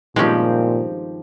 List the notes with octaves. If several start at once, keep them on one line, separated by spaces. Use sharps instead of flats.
G2 A#2 D#3 F3 G#3 C4 C#4 G4